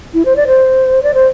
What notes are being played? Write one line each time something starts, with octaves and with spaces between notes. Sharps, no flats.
E4
C5
D5
C5
D5
C5